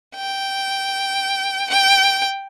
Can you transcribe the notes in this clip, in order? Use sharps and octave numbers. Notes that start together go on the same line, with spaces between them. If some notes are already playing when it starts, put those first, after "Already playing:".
G5
G5